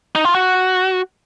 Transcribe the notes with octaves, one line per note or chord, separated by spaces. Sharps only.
D#4
F4
F#4